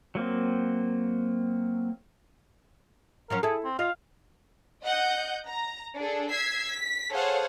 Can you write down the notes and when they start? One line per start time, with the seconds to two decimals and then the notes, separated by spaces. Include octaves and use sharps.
0.15 F#3 A#3 C4
3.30 F3 F#3 C#4 A#4
3.43 E4 G#4 A4
3.64 C4
3.79 F4 D#5 F5
4.82 D#5 F#5 G6
5.47 A#5
5.96 D4 G#4 A4
6.30 E6 G#6 B6 C7
6.66 B6
7.12 G#4 A4 C5 C#5 F5 F#5